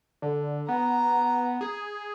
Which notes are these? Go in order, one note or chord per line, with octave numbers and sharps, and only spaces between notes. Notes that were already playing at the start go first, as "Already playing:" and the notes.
D3
B3 A#5
G#4